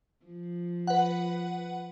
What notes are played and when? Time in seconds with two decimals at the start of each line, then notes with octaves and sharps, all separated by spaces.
0.25 F3
0.87 B4 F#5